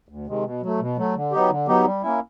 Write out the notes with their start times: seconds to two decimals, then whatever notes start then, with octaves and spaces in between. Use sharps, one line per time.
0.09 D2
0.26 C3 D#3 G#3
0.44 B2
0.62 F#3 A3
0.80 B2
0.97 F#3 A3
1.15 D3
1.32 F#3 B3 D#4 G4
1.50 D3
1.68 F#3 B3 D#4 G4
1.85 G3
2.02 A#3 C#4 E4